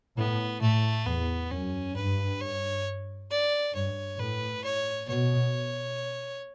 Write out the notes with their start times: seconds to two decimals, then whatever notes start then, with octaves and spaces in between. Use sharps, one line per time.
0.17 A2 B3
0.61 A2 A3
1.06 E2 B3
1.51 F#2 C#4
1.96 G2 B4
2.40 C#5
3.30 D5
3.74 G2 C#5
4.19 A2 B4
4.64 C#5
5.09 B2 C#5